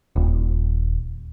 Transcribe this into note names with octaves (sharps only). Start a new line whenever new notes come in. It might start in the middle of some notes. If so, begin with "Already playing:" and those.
D#1